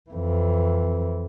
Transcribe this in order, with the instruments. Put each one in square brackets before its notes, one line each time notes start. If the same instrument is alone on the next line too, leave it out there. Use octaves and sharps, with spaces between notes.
[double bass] F2 E3